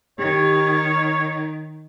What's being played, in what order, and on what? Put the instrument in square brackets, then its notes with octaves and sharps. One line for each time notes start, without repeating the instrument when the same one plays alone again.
[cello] D#3 [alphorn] G4 [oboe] C#5
[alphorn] D#4